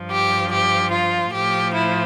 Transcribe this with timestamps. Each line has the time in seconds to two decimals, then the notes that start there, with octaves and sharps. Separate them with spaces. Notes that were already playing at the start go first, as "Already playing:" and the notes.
Already playing: G2 F3
0.11 G4
0.52 G4
0.92 F4
1.33 A2 F3 G4
1.74 E4